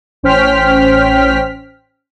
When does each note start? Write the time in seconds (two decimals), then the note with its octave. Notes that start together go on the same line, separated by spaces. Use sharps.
0.23 A1 C#4 C5 G5 F6 B6